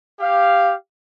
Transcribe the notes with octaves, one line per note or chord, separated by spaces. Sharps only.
G4 F5